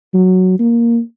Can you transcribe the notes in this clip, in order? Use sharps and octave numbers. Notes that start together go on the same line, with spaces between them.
F#3
A#3